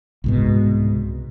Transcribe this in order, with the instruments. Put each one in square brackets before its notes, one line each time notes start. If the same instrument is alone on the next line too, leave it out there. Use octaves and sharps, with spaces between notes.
[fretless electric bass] C2 G#2 B2